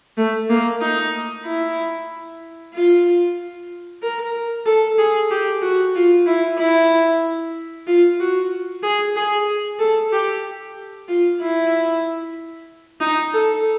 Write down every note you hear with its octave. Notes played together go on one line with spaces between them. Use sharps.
A3
A#3
D#4
E4
F4
A#4
A4
G#4
G4
F#4
F4
E4
E4
F4
F#4
G#4
G#4
A4
G4
F4
E4
D#4
A4